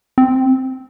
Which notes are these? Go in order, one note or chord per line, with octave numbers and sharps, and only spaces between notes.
C4